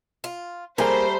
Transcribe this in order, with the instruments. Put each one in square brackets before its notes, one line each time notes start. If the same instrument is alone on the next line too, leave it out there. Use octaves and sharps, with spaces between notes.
[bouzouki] F4
[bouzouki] G3 A3 A#5 [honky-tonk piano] A#3 G#4 A#4 [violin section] C5